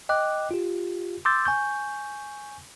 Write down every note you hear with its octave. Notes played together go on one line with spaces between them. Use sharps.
D#5 G5 D6 F#6
F4 G4
C6 D6 E6 G6 A6
G#5 C#6 G6